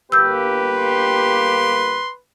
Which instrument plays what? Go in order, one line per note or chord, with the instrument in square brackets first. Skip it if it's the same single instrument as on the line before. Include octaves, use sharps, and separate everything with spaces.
[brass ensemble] G1 A#3 G4 [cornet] B4 [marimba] E6 G6
[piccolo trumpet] C6